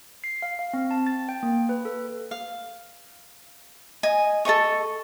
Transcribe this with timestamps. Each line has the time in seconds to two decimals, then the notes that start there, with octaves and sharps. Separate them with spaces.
0.24 C7
0.42 F5
0.59 F5
0.73 C4
0.91 A5
1.07 A6
1.29 G5
1.43 A#3
1.69 B4
1.85 A4
2.31 F5
4.03 D#5 G#5
4.45 A4 C#5 D#5 C#6